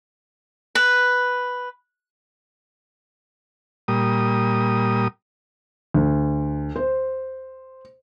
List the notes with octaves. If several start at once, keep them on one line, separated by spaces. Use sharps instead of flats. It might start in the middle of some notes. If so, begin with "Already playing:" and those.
B4
A#2 G3 D#6
D2
C5